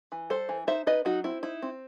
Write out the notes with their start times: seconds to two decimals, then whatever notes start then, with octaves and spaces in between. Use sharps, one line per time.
0.12 E3
0.30 G3 A4 C5
0.49 E3
0.67 D#4 C5 E5
0.86 D#4 B4 D#5
1.05 F#3 D#4 F#4
1.24 C4 E4
1.43 D#4 E4
1.62 C4